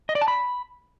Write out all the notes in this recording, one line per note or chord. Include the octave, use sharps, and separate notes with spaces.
D#5
D5
A5
B5